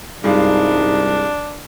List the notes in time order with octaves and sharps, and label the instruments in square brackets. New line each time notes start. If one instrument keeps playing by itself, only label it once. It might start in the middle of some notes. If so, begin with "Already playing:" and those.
[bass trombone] C2 [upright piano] G2 G#3 F4 [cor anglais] D4 [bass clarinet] D#4